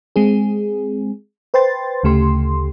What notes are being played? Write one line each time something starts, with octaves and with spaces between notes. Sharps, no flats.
G#3 C4 G#4
B4 C5 G5 C6 A6
D2 C#3 A3 G4 C6